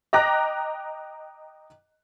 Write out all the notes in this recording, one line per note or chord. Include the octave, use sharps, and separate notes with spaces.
D#5 G5 A#5 D6 F#6 A#6